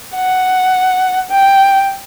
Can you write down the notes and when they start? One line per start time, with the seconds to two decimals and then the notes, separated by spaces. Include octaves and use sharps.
0.16 F#5
1.31 G5